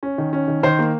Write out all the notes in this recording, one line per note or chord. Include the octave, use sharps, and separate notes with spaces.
C#4
D#3
C#4
D#3
D#3 C5
A#3